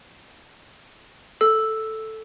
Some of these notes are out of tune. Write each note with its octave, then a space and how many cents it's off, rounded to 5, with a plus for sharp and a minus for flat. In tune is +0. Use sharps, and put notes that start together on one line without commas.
A4 +0 E6 +0